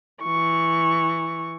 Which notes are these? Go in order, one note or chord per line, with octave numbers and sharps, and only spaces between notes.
E3 C#6